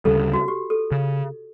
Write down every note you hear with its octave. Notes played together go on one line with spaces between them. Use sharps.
D2 C#3 G3 A4
F#4
G4
A4
C#3